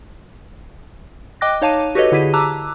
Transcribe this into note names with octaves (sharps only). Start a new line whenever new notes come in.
D#5 G5 D6 F#6 A#6
D#4 C#5 F5 A5 D6 D#7
F#4 G4 A4 B4 C#5 D#5
D3 E4 G4 G#4 B6 D#7
A5 A#5 D6 E6 F#6